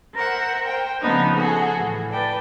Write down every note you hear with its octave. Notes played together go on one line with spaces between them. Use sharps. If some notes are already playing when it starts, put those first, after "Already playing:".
A#4 C5 E5 F#5
A#4 C5 G5
C#3 F3 A3 B3 D4 D#4
F#4 G#4 A4
A2 E3
B4 D5 G5 A5